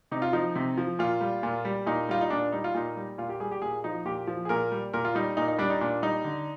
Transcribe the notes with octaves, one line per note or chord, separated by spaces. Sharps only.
C3 D#4
F4
F3 D#4
C3
F3
A#2 F4
G3
A#2
G3
A#2 D#4
G3 F4
D#4
A#2 D4
G3 D#4
F4
A#2 D#4
G3
A#2 F4
G4
G3 G#4
G4
A#2 G#4
F3 D#4
A#2 G4
F3
G#4
A#2 A#4
G3
A#2 A#4
F4
G3 D#4
A#2 D#4
D#4
G3 D4
D#4
A#2 D4
G3 D#4
D3